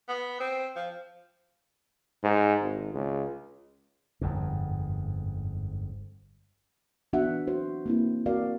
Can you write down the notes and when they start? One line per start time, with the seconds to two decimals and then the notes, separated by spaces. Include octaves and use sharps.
0.08 B3
0.40 C4
0.76 F3
2.23 G#2
2.61 G#1
2.94 C#2
4.21 G1 F2 G#2
7.13 E3 B3 D4 F#4 E5 F#5
7.47 F#4 C5
7.86 A#3 C4 E4
8.26 C4 F#4 A#4 D5 F5